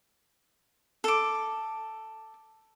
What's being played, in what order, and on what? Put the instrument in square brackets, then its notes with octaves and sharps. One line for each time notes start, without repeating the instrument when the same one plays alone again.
[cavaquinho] A4 D6